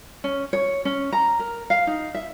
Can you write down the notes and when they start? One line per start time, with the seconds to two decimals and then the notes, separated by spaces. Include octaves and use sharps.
0.24 C#4
0.53 C#5
0.85 C#4
1.12 A#5
1.39 A#4
1.70 F5
1.87 D#4
2.14 E5